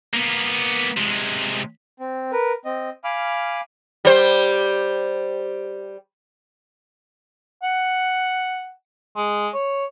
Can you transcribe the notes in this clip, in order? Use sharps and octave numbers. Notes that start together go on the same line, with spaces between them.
A#3 B3
C3 G#3
C4
A#4 B4
C4 D#5
F5 G#5 B5 D6 F6
G3 C5
F#5
G#3
C#5